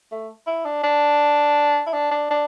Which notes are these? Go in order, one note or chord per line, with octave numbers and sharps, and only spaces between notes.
A3
E4
D4
D4
E4
D4
D4
D4